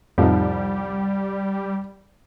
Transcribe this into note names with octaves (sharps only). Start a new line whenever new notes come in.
C2 F2 A2 F3 G3 D#4